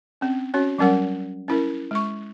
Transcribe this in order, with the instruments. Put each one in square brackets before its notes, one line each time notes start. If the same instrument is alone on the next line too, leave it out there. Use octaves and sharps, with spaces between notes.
[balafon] C4 C#4
C#4 F#4 C#5
F#3 G3 C#4 A#4 F#5
C#4 E4 A#4
G#3 C#6